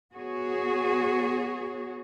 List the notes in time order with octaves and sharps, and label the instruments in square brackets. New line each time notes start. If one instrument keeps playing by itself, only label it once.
[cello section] B3 F#4 G#4 C#5